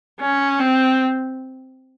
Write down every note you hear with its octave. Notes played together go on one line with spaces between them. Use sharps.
C#4
C4